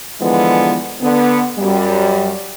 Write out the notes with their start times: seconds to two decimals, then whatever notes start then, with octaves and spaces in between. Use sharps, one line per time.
0.21 D3 E3 F3 G#3 B3
1.01 D3 B3
1.58 F#2 G3